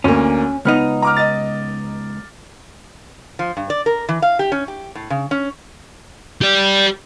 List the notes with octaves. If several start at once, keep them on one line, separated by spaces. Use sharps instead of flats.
D2 A#3 C#4
C#2 B3 D#4 F6
A#5 D6 F6
D#5 A6
F3
G2
D5
A#4
E3
F5
G4
C#4
G4
A2
C#3
C#4
G4 D5